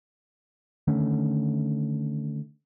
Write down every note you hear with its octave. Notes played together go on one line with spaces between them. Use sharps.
D3 D#3 A3 C#4